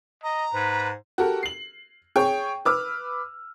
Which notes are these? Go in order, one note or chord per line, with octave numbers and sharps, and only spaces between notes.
D#5 A#5
G#2 B4
F#4 G4 A4 A#4
C7 F#7
G#4 C#5 G5 C#6
B4 D6 E6 F6